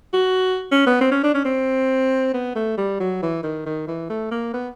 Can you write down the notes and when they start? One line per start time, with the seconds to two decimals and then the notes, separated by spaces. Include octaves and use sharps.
0.13 F#4
0.71 C#4
0.87 B3
1.01 C4
1.12 C#4
1.23 D4
1.34 C#4
1.45 C4
2.34 B3
2.55 A3
2.78 G3
3.00 F#3
3.22 E3
3.43 D#3
3.66 D#3
3.88 E3
4.10 A3
4.31 A#3
4.54 B3